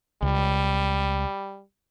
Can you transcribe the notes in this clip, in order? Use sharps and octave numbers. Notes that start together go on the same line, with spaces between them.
C#2 G3